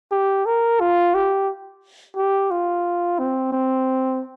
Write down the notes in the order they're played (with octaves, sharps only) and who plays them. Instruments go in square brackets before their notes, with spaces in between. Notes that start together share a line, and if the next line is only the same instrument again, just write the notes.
[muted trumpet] G4
A#4
F4
G4
G4
F4
C4
C4